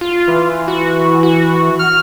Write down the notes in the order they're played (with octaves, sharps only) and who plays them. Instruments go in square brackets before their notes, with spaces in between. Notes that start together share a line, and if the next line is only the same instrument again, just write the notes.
[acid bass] F4
[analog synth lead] E3
[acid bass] F#4
F#4
[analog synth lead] F6